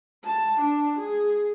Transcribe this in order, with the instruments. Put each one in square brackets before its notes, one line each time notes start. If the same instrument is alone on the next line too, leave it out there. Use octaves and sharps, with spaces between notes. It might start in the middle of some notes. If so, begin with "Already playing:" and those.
[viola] A5
D4
G#4